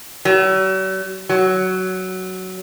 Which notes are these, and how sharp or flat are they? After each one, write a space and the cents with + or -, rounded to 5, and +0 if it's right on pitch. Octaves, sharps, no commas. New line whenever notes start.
F#3 +45
F#3 +10